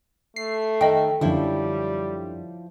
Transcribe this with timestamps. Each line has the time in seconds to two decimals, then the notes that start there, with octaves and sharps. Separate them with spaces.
0.36 A3 C7
0.81 D#3 A4 D#5 G5
1.21 F#2 D3 F3 G3 E4 C#5